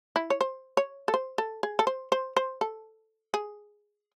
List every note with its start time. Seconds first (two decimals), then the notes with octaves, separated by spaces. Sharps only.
0.16 E4
0.30 C#5
0.41 C5
0.77 C#5
1.08 A4
1.14 C5
1.38 A4
1.63 G#4
1.79 A4
1.87 C5
2.12 C5
2.37 C5
2.61 A4
3.34 G#4